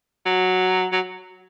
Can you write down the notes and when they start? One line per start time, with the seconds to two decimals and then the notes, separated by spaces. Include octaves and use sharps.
0.25 F#3
0.92 F#3